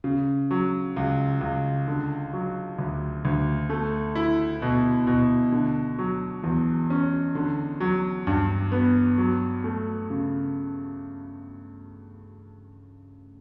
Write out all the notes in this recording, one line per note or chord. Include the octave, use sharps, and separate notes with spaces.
C#3
F#3
C#2
C#2
D3
F#3
D2
D2
A3
E4
B2
B2
D3
F#3
E2
C#4
D3
F#3
G2
B3
F#3
A3
C#3